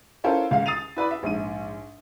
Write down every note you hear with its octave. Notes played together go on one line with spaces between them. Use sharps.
C#4 E4 F4 A4 A#4 C5
C#2 F5
D#6 A6 C7 D#7 F7
E4 B4 D5 B5
E5
A#1 G#2 D#7